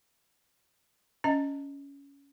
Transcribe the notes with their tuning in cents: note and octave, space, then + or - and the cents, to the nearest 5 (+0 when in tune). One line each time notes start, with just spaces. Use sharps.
C#4 +15 D#5 -5 A5 -5